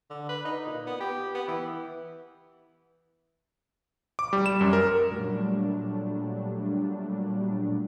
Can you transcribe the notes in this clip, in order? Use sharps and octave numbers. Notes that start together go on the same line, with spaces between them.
D3
B4
D#4
A#2
B3
G4
B3
E3
D6
G3
E7
F#2
A#4
A#2 F#3 G3 A3 D4